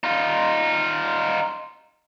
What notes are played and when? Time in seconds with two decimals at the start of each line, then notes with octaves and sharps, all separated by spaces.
0.04 D#4 F4